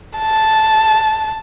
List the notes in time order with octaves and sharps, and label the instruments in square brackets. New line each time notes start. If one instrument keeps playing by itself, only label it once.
[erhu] A5